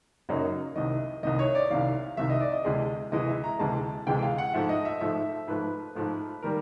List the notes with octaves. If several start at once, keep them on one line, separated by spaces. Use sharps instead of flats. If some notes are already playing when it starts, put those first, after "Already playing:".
F#2 C#3 F#3 A#3 D#4
C2 C3 D#3 D#5
C2 C3 D#3 D#5
C#5
D5
C2 C3 D#3 F5
C2 C3 D#3 E5
D#5
D5
D#5
D2 C3 E3 G#3
D2 C3 E3 G#3 D#5
E5
A#5
D2 C3 E3 G#3 A5
D2 C3 E3 G#3 G5
F5
F#5
G#2 F3 A3 E5
D#5
E5
G#2 F3 A3 E5
G#2 F3 A3 B4
G#2 F3 A3
D#3 G3 A#3 A#4